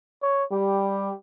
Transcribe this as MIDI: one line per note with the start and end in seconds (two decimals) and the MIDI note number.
0.22 0.44 73
0.52 1.10 55
0.52 1.16 67